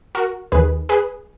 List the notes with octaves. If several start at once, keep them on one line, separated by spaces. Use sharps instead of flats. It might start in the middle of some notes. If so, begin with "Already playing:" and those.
F#4 A#4
D#2 D#3 G#4 B4
G#4 B4